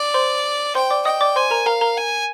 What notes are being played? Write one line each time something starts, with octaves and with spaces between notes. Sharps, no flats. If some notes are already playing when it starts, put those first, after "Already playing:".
Already playing: D5
C5 C6
C5 G5 C6
D5 D6
D#5 G5 D#6
D5 D6
C5 G#5 C6
A#4 A#5
A#4 F5 A#5
A#4 A#5
G#5